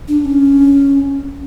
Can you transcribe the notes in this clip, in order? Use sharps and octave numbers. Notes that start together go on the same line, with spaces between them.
D4
C#4